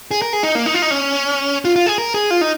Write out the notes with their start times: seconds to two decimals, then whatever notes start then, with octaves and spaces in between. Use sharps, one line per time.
0.11 G#4
0.22 A#4
0.33 G#4
0.43 D#4
0.55 A#3
0.66 D#4
0.74 F4
0.82 D#4
0.91 C#4
1.65 F4
1.76 F4
1.86 G#4
1.98 A#4
2.14 G#4
2.31 F4
2.41 D#4